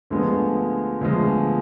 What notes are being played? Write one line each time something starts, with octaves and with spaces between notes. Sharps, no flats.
D2 D3 F3 G#3 B3
D2 D3 F3 G#3 B3